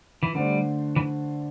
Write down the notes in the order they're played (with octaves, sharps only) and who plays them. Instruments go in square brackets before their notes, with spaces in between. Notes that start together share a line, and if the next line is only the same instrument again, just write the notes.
[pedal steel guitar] E3
[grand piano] D3 A3 D4 C5 [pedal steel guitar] G3
[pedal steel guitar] E3